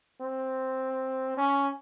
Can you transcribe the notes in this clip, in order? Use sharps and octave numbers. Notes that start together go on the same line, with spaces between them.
C4
C#4